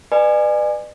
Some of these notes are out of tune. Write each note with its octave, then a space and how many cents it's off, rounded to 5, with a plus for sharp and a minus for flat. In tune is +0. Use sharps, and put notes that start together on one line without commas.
B4 +0 D5 +40 G#5 -10